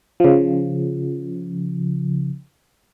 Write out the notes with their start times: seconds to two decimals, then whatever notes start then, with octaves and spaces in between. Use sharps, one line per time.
0.20 C#3 F3